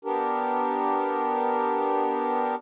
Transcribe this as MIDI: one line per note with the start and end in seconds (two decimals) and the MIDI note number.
0.05 2.55 59
0.05 2.55 62
0.05 2.55 67
0.05 2.55 70